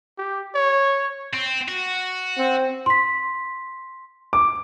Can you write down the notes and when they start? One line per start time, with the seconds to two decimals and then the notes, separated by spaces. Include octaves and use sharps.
0.18 G4
0.55 C#5
1.34 C4
1.68 F#4
2.38 C4
2.86 C6 B6
4.33 D6